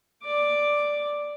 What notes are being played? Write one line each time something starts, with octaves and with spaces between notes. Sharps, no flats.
D5 D6